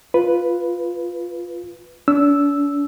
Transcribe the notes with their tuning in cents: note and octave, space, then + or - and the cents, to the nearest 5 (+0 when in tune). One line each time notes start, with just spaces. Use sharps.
F4 +0 B4 +0
D4 -45 E6 +0